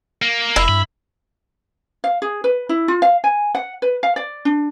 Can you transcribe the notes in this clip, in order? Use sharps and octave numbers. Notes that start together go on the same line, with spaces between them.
A#3
F1 E4
G2 B5
F5
G#4
B4
E4
F4
F5
G#5
F#5
B4
F5
D5
D4